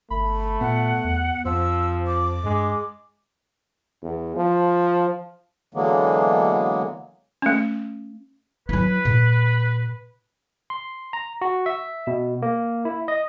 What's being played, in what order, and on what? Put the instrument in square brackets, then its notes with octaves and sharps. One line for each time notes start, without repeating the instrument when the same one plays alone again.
[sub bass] G1 [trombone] A3 [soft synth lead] B5
[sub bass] A#2 [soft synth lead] B3 [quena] F#5
[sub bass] E2
[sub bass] F2 [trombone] F3 [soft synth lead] C5 [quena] E6
[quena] D6
[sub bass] G2 [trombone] G#3
[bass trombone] E2
F3
[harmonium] D3 E3 F#3 G#3 A#3 B3
[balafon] A3 C#4
[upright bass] F#3 E4 [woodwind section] B4
[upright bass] A#2
[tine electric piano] C6
A#5
F#4
E5
B2
A#3
E4
D#5